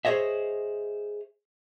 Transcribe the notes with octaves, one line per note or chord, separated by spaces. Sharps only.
G#4 C5 C#5 D#5 E5